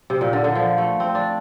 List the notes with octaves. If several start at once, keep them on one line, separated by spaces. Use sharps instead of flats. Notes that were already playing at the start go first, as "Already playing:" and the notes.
C3
A#2
D3
D3
F3
A3
C4
D4